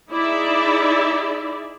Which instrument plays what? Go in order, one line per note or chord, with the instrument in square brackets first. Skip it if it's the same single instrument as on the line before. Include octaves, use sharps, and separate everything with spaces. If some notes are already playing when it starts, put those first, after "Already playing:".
[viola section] D#4 E4 G#4 D5 E5